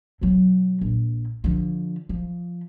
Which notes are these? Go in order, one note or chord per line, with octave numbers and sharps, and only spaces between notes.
B2 F#3
A#1
D3 F3
F3